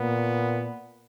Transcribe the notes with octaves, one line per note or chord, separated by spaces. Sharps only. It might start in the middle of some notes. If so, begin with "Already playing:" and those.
Already playing: A#2 B3